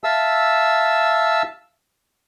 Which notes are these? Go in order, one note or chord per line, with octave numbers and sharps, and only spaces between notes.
E5 F5 A5 E6